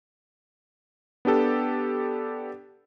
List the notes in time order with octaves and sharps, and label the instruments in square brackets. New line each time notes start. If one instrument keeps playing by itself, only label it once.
[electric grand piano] B3 D4 G4 A4